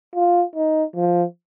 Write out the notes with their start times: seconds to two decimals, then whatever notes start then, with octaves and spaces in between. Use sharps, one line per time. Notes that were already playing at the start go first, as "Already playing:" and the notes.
0.15 F4
0.56 D#4
0.96 F3